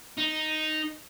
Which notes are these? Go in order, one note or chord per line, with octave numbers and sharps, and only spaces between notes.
D#4